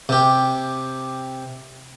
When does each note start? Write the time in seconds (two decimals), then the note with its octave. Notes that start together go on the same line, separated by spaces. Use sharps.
0.09 C3 G4